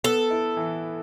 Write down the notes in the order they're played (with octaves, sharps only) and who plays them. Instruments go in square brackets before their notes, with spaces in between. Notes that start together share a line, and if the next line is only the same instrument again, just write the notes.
[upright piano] B3 [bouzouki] A4
[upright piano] E4
E3